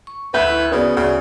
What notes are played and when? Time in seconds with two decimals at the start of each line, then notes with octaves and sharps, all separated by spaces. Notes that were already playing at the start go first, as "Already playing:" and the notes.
0.07 C#6
0.34 D2 B4 E5 G6
0.50 E4 C#6
0.72 C#3 B3 F#4 D5
0.97 D2 C#3